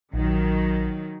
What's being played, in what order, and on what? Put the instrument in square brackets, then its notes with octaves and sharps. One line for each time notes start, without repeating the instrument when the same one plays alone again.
[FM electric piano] A#1 [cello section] D#3 F#3